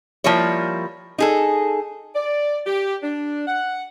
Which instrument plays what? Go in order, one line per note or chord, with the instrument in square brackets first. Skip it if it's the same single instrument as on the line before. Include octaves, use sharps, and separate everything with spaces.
[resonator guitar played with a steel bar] F3 G3 A#3 E4 C#5
D#4 G#4 A4
[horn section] D5
G4
D4
F#5